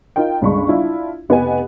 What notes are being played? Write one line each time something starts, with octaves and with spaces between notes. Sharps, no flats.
D#4 F4 A#4 G5
G1 C#2 G#3 D4 B5 C#6
D4 E4 F4
F1 B3 G4 D#5 G#5